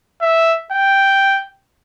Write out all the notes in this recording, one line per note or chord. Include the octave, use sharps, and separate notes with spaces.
E5
G5